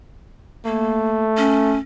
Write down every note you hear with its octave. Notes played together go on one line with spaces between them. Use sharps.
A3 A#3
C#4